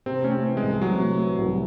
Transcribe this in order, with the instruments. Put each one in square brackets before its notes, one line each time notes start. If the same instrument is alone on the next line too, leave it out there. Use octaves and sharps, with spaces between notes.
[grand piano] C3 [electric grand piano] C4
[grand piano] A3 [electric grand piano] C#4
[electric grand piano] C4
[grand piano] E3
[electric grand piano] G#3
[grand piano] C2
[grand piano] C3 [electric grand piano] F#3
[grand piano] A3
E3
C2